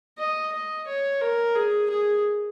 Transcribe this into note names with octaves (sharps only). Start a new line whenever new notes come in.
D#5
D#5
C#5
A#4
G#4
G#4